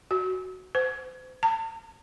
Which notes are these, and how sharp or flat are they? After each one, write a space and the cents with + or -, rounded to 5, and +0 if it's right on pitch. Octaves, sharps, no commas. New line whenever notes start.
F#4 +5
C5 -35
A5 +35